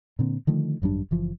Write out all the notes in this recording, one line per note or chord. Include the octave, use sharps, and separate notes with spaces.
A#2 D3 C4
D3 D#3 F3 A3
G#1 F#2 G3 D4
F#1 E3 F3